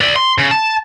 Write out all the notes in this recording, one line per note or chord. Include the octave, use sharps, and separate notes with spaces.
D5 E5
C6
C#3
A5